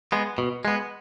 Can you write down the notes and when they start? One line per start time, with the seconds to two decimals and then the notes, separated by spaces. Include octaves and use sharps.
0.12 G#3 B3
0.38 B2
0.65 G#3 B3